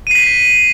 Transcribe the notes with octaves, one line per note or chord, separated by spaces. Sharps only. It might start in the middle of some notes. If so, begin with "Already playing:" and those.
B6 C7 D#7